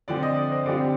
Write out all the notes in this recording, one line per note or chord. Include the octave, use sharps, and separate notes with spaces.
D3 F3 C4 D5
D#5
D5
C5
D3 G3 C4 F4 D5
G4